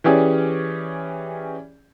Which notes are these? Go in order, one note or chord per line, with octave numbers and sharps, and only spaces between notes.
E3 C#4 G4 G#4 D5